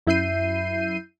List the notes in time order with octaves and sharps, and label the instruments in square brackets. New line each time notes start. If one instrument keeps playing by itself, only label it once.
[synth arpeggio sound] F#2 E4 E5 G6 C7 D#7